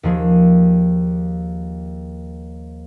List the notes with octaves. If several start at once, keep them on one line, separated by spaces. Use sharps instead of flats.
D#2 F3 G#4